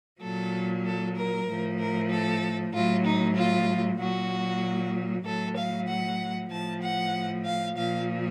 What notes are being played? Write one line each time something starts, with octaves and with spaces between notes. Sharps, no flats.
A#2 F#3 A4
A4
A#4
A2 F3
A#4
A4
A2 F#3 F4
D#4
F4
A#2 F#3 F#4
A2 F#3 A4
F5
F#5
A2 F3 A5
F#5
F5
A#2 F3 F5